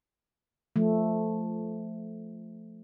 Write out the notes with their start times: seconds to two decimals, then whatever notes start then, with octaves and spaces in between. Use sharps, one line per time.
0.76 F3 A3